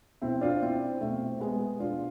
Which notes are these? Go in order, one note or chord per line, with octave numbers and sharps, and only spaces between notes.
B2 C4 E4
D4 F4
C4 E4
B2 A3 C4
G#3 B3
B2 D4 F4